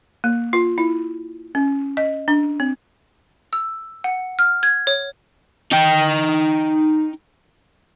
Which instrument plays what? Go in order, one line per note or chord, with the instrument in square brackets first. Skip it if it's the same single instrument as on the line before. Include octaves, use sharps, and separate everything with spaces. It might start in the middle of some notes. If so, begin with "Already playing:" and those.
[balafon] A#3
F4
E4
C#4
D#5
D4
C4
[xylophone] E6
F#5
F6
G#6
C#5
[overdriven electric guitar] D#4 G5